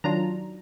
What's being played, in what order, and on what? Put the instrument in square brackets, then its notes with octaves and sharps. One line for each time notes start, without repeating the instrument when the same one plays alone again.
[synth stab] D#3 F#3 D4 F4 A#5